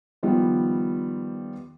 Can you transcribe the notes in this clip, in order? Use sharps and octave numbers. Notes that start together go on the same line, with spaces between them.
D#3 F3 G3 B3